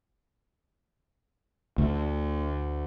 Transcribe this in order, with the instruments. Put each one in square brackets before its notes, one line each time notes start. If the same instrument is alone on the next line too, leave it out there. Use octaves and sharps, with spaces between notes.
[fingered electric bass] D2